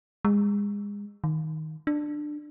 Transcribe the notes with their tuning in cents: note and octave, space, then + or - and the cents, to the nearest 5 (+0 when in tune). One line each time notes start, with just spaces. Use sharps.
G#3 -30
D#3 +10
D4 +15